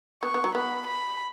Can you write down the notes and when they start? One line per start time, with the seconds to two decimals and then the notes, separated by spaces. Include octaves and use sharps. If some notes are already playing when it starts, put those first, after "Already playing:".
0.23 B3 C#6
0.34 B3
0.44 F#3
0.55 B3 B5
0.87 B5